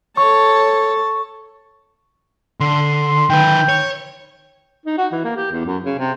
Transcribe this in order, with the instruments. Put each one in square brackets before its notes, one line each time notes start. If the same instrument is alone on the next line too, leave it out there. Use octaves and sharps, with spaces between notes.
[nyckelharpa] A4 A5 [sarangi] C#5 [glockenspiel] C#6
[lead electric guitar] D3 [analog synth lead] C6
[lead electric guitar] D#3 B4 [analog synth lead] G5
[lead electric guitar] C#5
[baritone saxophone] D#4
F#4
E3
A#3
G4
E2
F#2
C#3
C3